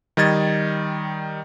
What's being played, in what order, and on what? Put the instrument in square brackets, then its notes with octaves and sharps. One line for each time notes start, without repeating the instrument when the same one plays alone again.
[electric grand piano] D#3 G3 D#5 G#6 A6